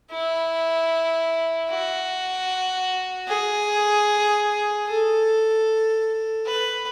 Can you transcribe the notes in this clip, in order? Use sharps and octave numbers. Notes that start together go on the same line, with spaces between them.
E4
F#4
G#4
A4
B4